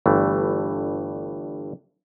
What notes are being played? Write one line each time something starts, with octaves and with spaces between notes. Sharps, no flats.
G1 G2 E3 A3